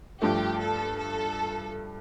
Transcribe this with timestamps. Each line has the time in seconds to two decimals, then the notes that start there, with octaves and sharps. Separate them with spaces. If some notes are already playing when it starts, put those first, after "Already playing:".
0.21 G2 F3 A3 G4
0.60 A4
0.98 A4